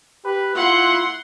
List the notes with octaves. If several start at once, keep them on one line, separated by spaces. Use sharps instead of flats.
G4 B4
E4 F4 F#5 C6